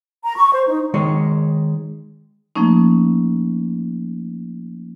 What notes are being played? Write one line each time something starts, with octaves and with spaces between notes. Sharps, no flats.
A#5
C#6
C5
D#4
D#3 G#3 C#5
F3 A3 A#3 C#4 D#4